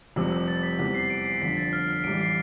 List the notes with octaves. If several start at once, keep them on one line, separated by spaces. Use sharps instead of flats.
F1 F2 C3 G3 E6
E6
A6
B6
E2 C3 E3 G3 B6
C7
D7
C7
G1 F2 D3 B6
B6
A6
F6
F6
A1 A2 E3 G3 D7
C7